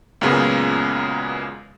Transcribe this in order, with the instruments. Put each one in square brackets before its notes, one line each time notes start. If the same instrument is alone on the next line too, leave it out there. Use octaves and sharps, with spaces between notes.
[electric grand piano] C#2 F#2 A#2 C#3 G#3 B3